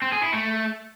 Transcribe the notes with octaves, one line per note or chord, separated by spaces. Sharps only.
C4
G#4
E4
A3